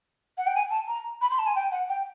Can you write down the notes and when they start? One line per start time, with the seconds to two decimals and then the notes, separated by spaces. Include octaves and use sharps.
0.38 F#5
0.47 G5
0.55 G#5
0.71 A5
0.88 A#5
1.21 B5
1.31 C6
1.39 A5
1.47 G#5
1.55 G5
1.72 F#5
1.89 G5